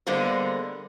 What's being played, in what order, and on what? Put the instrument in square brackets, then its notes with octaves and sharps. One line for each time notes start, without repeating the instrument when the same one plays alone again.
[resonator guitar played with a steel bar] D3 G3 G#3 A#3 B3 C5